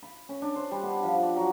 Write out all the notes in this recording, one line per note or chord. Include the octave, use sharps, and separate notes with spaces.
B5
C#4
D4
C5
G3
B3
F3
D5
F#3